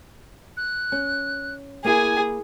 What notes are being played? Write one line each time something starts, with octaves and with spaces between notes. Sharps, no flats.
F#6
C#4
A#3 E4 G#4 G#5